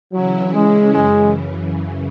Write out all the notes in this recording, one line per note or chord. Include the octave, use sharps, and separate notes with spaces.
C#3 E3 F#3 C#4 E4
G#3
F#2 C#3 E3 G#3